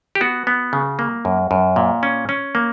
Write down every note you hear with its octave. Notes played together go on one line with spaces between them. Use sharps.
G4
B3 F#4
B3
C#3
A#3
F#2
F#2
A#2
C#4
C#4
A#3